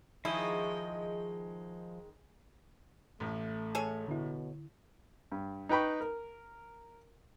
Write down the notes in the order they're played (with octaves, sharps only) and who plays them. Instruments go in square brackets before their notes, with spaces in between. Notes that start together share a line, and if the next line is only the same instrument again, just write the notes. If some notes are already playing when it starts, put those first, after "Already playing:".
[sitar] D#3 G#3 [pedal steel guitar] F3 D#5 [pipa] E4 [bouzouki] G#4
[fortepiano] A1 A2 [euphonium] A3
[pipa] G#4 A4 C#5
[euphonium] B2 [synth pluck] D3 E4
[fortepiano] G2
D#4 B4 G5 B5 C#6
A#4